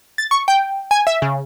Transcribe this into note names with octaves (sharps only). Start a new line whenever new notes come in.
A6
C#6
G5
G#5
E5
C#3